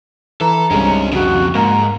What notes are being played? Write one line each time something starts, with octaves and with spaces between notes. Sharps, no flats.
E3 A4 A#5
C2 G2 G#3 C#4
F2 C#3 F#4
G#2 A#3 A#5